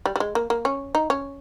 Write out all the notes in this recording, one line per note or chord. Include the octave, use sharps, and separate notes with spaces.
G3
G3
G#3
A#3
A#3
C#4
D#4
C#4